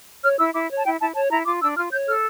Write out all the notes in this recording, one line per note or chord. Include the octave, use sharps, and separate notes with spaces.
C#5 F6
E4 E6
E4 D6
C#5
A5
E4 G5
E4 A5
C#5 A5
E4 A#5
F4 D6
D4 E6
F4 F6
C#5 G6
A4 F6